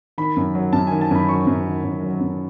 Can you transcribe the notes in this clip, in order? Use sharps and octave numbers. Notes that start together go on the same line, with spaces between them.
D#3 B5
F#2
F#3
F#2 A5
D#3 G#5
A5
F#2 B5
F#3 C#6
F#2
D#3
F#2
F#3
F#2